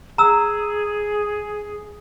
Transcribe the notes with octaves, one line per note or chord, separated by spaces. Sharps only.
G#4 A#5 E6